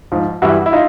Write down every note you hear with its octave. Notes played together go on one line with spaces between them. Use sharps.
G#2 F3
G2 E3 G3 E4 F#4
E4
D#4 F4